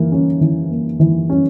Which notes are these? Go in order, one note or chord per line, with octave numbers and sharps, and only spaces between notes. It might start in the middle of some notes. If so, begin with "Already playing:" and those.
Already playing: E3 A#3
C#4
E3
A#3
E3
C#4